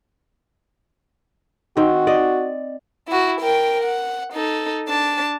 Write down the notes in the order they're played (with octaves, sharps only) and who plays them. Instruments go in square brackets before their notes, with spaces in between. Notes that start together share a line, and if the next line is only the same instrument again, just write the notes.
[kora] D#3 C4 [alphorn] F#4
[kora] D5 D#5
[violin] E4 F#4
A#4 G5
F#5
D#4 A4
D4 A5